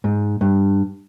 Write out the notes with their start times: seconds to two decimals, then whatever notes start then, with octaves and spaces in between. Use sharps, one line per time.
0.04 G#2
0.41 G2